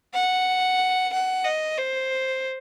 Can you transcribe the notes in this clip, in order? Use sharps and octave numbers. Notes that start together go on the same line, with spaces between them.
F#5
F#5
D#5
C5